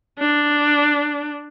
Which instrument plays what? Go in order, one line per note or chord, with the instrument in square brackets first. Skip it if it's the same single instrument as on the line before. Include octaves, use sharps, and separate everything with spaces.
[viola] D4